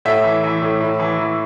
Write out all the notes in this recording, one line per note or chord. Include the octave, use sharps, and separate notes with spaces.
A2 E5
E3
E3
A2
A2
E3
E3